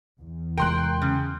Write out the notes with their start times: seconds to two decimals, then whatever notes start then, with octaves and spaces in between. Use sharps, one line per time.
0.20 E2
0.58 C3 G#3 A#4 G5 C6 F#6
1.02 C#3